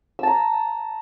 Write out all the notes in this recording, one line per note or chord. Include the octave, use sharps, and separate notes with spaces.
A5 A#5 E6